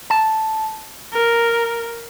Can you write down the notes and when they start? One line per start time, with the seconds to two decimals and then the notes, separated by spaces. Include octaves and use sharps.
0.10 A5
1.13 A#4